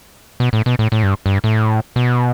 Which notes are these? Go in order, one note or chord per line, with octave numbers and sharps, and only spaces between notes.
B2
A2
B2
A2
A2
G2
G2
A2
B2